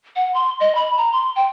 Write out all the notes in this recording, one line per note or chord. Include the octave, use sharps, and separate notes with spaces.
F#5
C6
D#5
B5
A#5
C6
G5